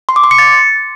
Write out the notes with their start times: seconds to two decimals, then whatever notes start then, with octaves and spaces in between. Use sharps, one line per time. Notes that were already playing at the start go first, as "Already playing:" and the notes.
0.09 C6
0.16 D6
0.24 C6
0.31 C#7
0.38 A6